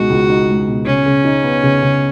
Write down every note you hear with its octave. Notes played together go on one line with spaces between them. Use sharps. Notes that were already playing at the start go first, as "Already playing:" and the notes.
Already playing: C#2 B2 G#3 D#4 F#4
C#2
D#4
G#3
B2
C#3 C#4
C#3
D#4
B3
C#3
C#3